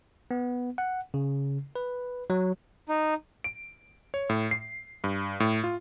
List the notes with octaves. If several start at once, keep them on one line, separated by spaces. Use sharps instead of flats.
B3
F#5
C#3
B4
F#3
D#4
D7
C#5
A2
C7
G2
A2
F4